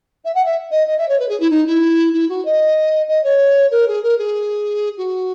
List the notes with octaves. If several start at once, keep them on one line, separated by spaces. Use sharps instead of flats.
E5
F#5
E5
D#5
D#5
E5
C#5
B4
G#4
E4
D#4
E4
E4
F#4
D#5
D#5
C#5
A#4
G#4
A#4
G#4
F#4